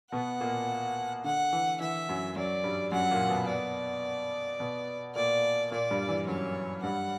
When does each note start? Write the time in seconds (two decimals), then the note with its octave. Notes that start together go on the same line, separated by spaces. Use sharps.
0.12 B2 B3 F#5
0.41 A#2 A#3
1.24 D3 F#5
1.53 E3
1.81 E3 E5
2.09 F#2 F#3
2.36 F#2 F#3 D5
2.64 G2 G3
2.92 F#2 F#3 F#5
3.11 A#2 A#3
3.29 B2 B3
3.48 D5
4.60 B2 B3
5.15 A#2 A#3 D5
5.71 A#2 A#3 D5
5.90 G2 G3
6.08 E3
6.27 F#2 F#3 C#5
6.83 G2 G3 F#5